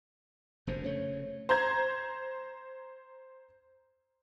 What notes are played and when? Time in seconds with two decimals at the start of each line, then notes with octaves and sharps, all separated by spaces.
0.67 F1 F#2 D3 C5
0.84 C#3 A3 C#5
1.49 C5 A#5 G6 G#6